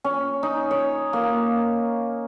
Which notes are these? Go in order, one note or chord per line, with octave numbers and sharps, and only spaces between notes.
C#4
D#4
C#5
A#3